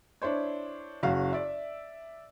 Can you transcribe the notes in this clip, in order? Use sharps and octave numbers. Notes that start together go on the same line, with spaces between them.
D4 E4 C5 C#5
F#1 C#3 F#4 F5
D5 E5